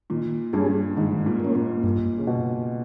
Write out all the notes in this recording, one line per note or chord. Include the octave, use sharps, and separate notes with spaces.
A#2 D#3
G2 G3 C#4 G#4
G#2 D#3
A#2
A#3 C#4
A#2
G2 A#2
C#3
B2